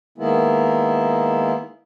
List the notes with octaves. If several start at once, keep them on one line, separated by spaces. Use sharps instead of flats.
D#3 G#3 A#3 B3 E4